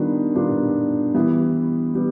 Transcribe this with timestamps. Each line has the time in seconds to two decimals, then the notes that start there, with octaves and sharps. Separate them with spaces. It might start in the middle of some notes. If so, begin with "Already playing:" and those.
Already playing: D#3 G3 B3 D4 F4
0.35 D#3 G3 B3 D4 F4
1.14 E3 G3 B3
1.95 G3 B3